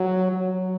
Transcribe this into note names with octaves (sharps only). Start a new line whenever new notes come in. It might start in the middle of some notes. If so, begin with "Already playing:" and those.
Already playing: F#3
F#3